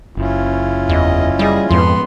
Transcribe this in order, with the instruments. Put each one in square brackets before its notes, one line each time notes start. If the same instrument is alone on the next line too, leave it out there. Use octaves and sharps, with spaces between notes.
[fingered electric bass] F#1 [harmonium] C#4 E4 F4
[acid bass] E2 [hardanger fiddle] D#5
[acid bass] G3 [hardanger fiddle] G#4 D#5
[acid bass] F2 [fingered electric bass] G#2 F3 [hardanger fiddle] B3 C6